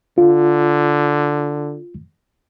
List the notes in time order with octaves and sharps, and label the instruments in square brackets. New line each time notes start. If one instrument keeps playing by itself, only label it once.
[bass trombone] D3 [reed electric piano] F4